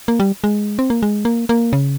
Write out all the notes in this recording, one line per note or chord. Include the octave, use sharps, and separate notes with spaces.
A#3
G3
G#3
C4
A#3
G#3
A#3
A#3
C#3